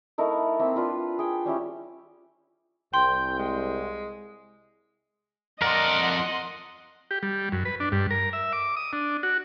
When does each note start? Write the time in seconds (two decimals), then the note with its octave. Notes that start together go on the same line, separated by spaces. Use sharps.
0.18 A3 D#4 E4 A#4
0.59 A#3 C4 E5
0.76 D4 F4 B4
1.19 G#4 G5
1.45 G3 C#4 E4 G4
2.94 C2 G5 C6
3.39 G#3
5.62 F2 A#4 D5 D#5 F#5 C6
7.11 G4
7.23 G3
7.52 F#2
7.65 B4
7.80 D4
7.92 G2
8.11 A#4
8.33 E5
8.53 D6
8.77 D#6
8.93 D4
9.23 F#4